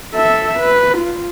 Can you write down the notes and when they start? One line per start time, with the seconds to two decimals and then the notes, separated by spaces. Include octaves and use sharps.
0.14 A4 E5
0.59 B4
0.98 F4